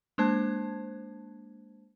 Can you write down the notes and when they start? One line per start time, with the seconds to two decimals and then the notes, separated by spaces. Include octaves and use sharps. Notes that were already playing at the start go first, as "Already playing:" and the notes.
0.18 G#3 A#3 D4 C5 A5 G#6